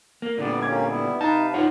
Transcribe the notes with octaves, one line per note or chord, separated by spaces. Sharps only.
A#3
A#2 D3 G3 B3 D5
A#3 C#4 G4 D6 G#6
G3 B3 E4
C3 D#4 B4 F5 A5
D#4 F4 C#5 F#5